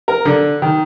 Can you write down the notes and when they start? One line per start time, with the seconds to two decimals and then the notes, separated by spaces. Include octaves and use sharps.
0.08 A#4
0.25 D3
0.62 D#3